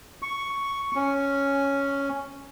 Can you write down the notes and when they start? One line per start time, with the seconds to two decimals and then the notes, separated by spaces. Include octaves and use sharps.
0.22 C#6
0.96 C#4